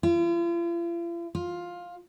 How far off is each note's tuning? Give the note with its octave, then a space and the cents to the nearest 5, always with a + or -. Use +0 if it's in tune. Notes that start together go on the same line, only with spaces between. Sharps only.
F4 -45
F4 +10